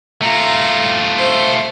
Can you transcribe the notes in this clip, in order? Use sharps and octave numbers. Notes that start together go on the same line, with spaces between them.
A3 F4 A#5
C5